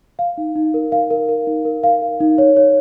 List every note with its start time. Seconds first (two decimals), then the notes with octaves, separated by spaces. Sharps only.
0.19 F5
0.38 D#4
0.56 D#4
0.74 A#4
0.92 F5
1.10 A#4
1.29 A#4
1.47 D#4
1.65 A#4
1.83 F5
2.02 A#4
2.20 D#4
2.38 C#5
2.57 C#5